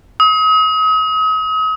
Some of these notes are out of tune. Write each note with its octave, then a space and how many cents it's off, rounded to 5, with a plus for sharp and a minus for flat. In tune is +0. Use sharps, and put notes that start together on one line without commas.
D#6 +40